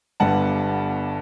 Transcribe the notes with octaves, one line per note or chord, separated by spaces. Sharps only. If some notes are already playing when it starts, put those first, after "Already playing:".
G1 G2 D3 G3 B3 F#5 A5